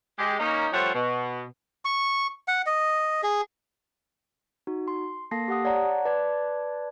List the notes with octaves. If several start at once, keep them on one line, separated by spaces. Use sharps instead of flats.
G#3 G4
A#3 C#4 D#4
F3 G3 A3 C5 C#5 F#5
B2
C#6
F#5
D#5
G#4
D#4 F#4
C6
A#3 A4 A5 A#6 C7
G4 F#5 D#6
C#5 D5 F#5 A5 A#5
B4 D5 A5 D6 G#6